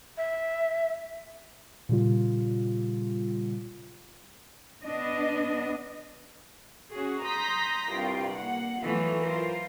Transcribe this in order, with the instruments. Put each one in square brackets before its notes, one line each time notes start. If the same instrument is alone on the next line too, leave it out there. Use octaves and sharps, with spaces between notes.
[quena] E5
[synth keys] A#2 C#3 G3 F4
[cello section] B3 D4 D#5
[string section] C#4 F#4 G#4
A#5 C6 D#6 G6 A#6 B6
C2 G2 F4 G5
A#3 F#5
E3 F#3 A3 B3 F4
F4 A#4 C5